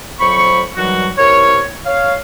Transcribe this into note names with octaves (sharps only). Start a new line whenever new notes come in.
F2 F#3 C5 B5 C#6
D#3 E3 F#3 G3 F#4
C3 E4 A#4 C#5
C#5 F5